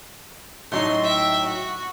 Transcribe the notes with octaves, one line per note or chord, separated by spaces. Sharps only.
A2 F#3 D#4 C6
E5 G5
F#4